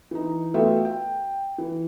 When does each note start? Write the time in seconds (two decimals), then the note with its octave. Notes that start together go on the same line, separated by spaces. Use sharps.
0.11 E3 D#4
0.54 A3 B3 F4 F#4 E5 G5
0.85 G5
1.58 E3